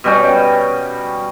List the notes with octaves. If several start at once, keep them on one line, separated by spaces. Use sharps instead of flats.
B2 G3 C#4 G5